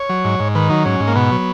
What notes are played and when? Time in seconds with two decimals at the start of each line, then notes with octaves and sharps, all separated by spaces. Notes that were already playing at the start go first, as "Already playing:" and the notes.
Already playing: C#5
0.09 F#3
0.25 G#2
0.39 G#2
0.55 D#3 B4
0.70 F#3 D#4
0.85 G#2 C#4
1.00 G#2
1.07 A#3
1.16 B2 B3
1.31 F#3